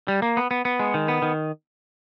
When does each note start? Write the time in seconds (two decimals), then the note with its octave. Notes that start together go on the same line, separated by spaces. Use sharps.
0.08 G3
0.22 A#3
0.37 B3
0.51 B3
0.65 B3
0.80 G#3
0.94 D#3
1.08 B3
1.22 D#3